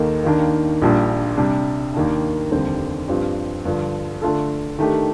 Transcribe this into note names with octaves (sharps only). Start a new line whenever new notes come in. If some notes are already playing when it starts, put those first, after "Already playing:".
Already playing: D#2 D#3 A#3 D#4 A4
D#2 D#3 A#3 D4
A#1 A#2 G3 D4
C3 G3 D4
D#2 D#3 A#3 D4
F1 D#2 D3 G3 C4
G2 F3 C4 G4
G2 D3 F3
D3 A3 D4 F4 A4
D#3 A3 D4 G4